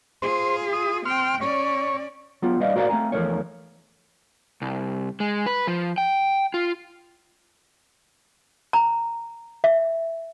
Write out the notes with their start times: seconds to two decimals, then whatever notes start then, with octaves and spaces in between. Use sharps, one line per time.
0.22 F4 G#4 C5
0.73 D#6
1.05 C4 G5 C6 F6
1.41 C#4 C#5 D5
2.42 F#3 B3 F4
2.60 G3 B4 D5 D#5 F5
2.75 A2 F#4 A#4 C5 D5 F5
2.89 A3 C4 F5 G#5 A#5
3.12 E2 F3 A3 A#4 C#5
4.62 C2
5.20 G#3
5.46 B4
5.67 F3
5.98 G5
6.54 F4
8.73 A#5
9.64 E5